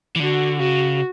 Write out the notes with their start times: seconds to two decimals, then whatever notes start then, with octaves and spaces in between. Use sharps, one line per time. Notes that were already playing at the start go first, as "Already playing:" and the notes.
0.16 E3
0.20 D3 F#4
0.59 C#3 F#4